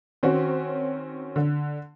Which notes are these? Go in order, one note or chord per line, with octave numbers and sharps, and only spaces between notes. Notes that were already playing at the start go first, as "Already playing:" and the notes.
D#3 C4 C#4 F#4
D3